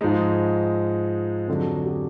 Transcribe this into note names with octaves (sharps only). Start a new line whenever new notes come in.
G#2 F3 G#3 D#4
F2 D3 F#3 A4
G#4
G4